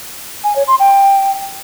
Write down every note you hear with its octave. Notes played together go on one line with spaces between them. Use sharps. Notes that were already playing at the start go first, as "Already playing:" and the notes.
G#5
C#5
C6
G5